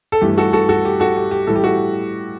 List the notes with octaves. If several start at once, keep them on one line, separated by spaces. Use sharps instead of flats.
A4
G2 E3 A3 G4
F#4 A4
F#4 A4
F#4 A4
G4
F#4 A4
G4
G4
A2 E3 G3 A4
G4
F#4 A4